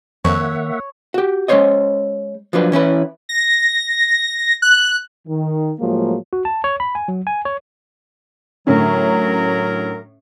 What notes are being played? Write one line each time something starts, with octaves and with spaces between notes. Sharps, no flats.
F2 D#3 A#3 C#5 E5 F#5
F#4 G4
G#3 C#4 F#4 C5 C#5 D#5
F3 F#3 D4 B4
E3 C#4 E4 B4
A#6
F#6
D#3
A2 F3 F#3 G#3 A#3
F#4
A5
C#5
B5
G#5
F#3
G#5
C#5
A2 D3 F#3 C#4 A#4